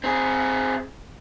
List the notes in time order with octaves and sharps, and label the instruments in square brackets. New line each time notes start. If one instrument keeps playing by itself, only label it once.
[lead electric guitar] C4 G#4